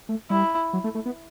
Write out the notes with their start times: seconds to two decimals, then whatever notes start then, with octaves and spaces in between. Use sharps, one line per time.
0.09 A3
0.30 G3 E4
0.73 F#3
0.84 A3
0.95 A3
1.06 B3